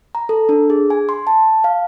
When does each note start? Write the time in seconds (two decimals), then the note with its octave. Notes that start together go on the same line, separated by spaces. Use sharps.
0.15 A#5
0.29 A4
0.49 D4
0.70 G#4
0.90 G#5
1.09 C6
1.27 A5
1.64 F5